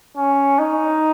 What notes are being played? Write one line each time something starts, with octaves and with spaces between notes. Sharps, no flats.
C#4
D#4